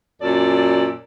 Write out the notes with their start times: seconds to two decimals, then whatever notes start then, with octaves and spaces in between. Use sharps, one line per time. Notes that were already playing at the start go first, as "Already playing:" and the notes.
0.21 F#2 A#2 A4 D5